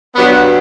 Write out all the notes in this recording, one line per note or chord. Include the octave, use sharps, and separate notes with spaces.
G2 F#3 B3